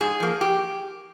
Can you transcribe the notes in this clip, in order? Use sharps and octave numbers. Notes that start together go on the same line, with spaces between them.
G#2 G#4
F3 A#3
G4